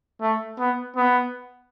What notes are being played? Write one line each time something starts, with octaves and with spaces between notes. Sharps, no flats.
A3
B3
B3